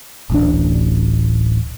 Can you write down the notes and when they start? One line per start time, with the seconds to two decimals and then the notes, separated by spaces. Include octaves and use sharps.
0.30 D1 A1 D4